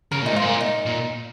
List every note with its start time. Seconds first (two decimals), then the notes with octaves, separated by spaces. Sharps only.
0.11 C#3 A#4
0.22 A#2 D#4
0.31 G#2 F4
0.42 A#2
0.60 D#4
0.86 A#2